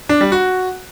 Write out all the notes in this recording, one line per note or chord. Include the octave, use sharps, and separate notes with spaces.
D4
G3
F#4